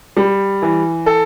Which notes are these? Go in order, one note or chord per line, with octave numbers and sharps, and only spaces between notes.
G3
E3
A4